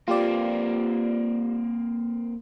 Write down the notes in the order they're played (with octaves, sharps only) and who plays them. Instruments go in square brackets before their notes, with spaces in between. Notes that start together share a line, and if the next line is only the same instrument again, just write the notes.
[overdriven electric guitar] A#3 C4 [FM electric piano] F4 G4 D5